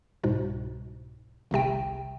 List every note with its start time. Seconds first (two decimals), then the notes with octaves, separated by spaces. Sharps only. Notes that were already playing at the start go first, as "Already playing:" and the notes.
0.23 C2 G#2 B2
1.51 G1 C2 C3 G5